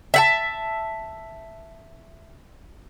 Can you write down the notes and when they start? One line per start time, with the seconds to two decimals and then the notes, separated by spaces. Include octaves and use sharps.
0.14 E5 F#5 A5